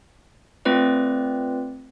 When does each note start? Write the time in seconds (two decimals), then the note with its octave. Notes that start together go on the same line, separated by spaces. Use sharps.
0.65 A3 C4 F4 B4 D5